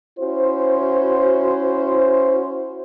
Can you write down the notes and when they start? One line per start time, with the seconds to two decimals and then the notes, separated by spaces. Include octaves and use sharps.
0.19 C#4 E4 F#4 C5